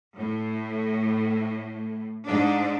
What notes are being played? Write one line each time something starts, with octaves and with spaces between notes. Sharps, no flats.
A2
G#2 D4